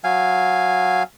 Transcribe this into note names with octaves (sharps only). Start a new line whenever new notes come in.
F#3 F5 G#5